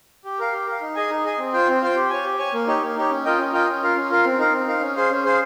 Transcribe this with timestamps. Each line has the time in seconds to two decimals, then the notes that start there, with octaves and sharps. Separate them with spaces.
0.25 G4
0.39 A#4 F5
0.52 G4
0.67 A#4
0.72 F5
0.81 D#4
0.96 G#4 D#5 G#5
1.10 D#4
1.24 G#4 D#5 G#5
1.38 C4
1.53 F4 C5 G5
1.68 C4
1.81 F4 C5 G5
1.96 G4
2.10 C#5 G#5
2.24 G4
2.38 C#5 G#5
2.53 A#3
2.67 D#4 G4 C#5
2.82 A#3
2.96 D#4 G4 C#5
3.10 C#4
3.25 F4 A#4 D#5 G5
3.38 C#4
3.52 F4 A#4 D#5 G5
3.68 C#4
3.82 F4 A#4 F5
3.96 C#4
4.10 F4 A#4 F5
4.24 C4
4.38 D#4 A#4 F5
4.53 C4
4.67 D#4 A#4 F5
4.81 C#4
4.96 G#4 C5 F5
5.10 C#4
5.25 G#4 C5 F5